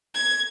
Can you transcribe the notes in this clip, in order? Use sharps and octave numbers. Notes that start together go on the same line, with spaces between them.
G#6